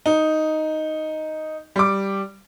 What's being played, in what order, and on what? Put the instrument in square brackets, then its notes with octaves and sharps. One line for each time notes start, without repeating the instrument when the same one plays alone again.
[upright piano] D#4
G3 D6